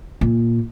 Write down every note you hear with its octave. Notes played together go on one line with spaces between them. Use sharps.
A#2